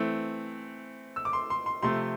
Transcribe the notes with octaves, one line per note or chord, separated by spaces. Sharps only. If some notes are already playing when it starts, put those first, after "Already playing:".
Already playing: E3 A3 C4
E6
D6
C6
C6
C6
C3 F3 A3 C4 C6